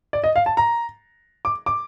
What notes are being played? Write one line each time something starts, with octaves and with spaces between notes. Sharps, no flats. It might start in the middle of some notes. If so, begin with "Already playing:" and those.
D5
D#5
F5
A5
A#5
D6
D6